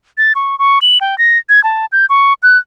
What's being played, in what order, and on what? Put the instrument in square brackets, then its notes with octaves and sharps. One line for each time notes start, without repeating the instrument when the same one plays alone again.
[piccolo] A6
C#6
C#6
F#7
G5
A#6
G#6
A5
G6
C#6
F#6